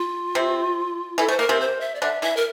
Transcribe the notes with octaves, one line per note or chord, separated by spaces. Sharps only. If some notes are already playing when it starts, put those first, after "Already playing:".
Already playing: F4
C3 C4
E3 E4 A4
A3 C5
A#3 A#4
C3 C4
C5
E5
D5
D3 D4 E5
E3 E4 E5
A#4